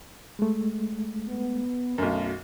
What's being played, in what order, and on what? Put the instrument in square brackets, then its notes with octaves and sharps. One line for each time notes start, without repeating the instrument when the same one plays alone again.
[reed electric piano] G#3 A3
[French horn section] B3
[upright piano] B1 F#2 [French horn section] A3 F#4